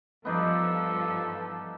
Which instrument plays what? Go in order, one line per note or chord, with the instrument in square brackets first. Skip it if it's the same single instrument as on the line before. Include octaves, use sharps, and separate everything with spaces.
[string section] G2 F3 [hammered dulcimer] B3 D#4 D5 [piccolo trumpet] A4